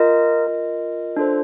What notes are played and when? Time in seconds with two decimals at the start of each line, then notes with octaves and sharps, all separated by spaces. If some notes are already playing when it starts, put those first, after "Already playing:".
Already playing: F4 A#4 D#5
0.45 F4 A#4 D#5
1.16 D4 F4 A4 C5